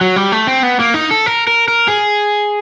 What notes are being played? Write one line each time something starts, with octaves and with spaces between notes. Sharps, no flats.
F#3
G3
A3
C4
B3
A#3
D#4
A4
A#4
A#4
A#4
G#4